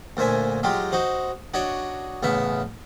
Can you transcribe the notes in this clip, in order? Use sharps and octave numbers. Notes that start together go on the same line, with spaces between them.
D2 A#2 C5 E5 G#5
F#3 G#3 F4 G4
D#4 F#4 C5
D4 F#4 C#5 D#5
A1 C#3 B3 E5